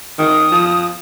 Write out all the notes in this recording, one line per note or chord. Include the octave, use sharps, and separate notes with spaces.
D#3 D#6
F3